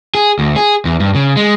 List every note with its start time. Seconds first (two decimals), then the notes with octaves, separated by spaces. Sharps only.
0.15 G#4
0.39 D2
0.56 G#4
0.85 E2
1.00 G2
1.15 C#3
1.37 G#3